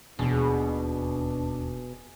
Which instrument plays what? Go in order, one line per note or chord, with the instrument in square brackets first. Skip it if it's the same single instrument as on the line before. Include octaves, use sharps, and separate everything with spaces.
[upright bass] E1 D#2 [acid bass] B2 [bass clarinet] D4 [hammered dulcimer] G#4